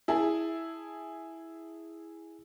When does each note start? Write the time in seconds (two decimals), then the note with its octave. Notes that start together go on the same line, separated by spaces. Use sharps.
0.08 E4 G#4 A5